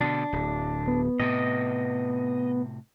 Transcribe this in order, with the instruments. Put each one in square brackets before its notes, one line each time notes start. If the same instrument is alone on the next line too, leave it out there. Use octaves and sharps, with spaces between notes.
[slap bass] B2 D3 [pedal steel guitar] D4
[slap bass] D1
[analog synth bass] B3
[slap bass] A2 C3 [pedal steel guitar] D#5